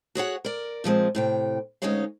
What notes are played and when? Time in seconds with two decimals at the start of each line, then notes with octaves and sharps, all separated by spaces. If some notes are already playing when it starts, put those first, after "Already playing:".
0.15 F#4 G#4 C#5 F#5
0.45 A#4 D5
0.84 A#2 F3 G#3 C4
1.15 A2 C3 G5
1.82 D2 G#3 C#4 D#4 C#5 F5